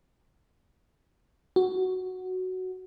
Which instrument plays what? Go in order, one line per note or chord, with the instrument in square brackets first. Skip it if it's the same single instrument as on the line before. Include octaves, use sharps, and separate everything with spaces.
[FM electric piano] F#4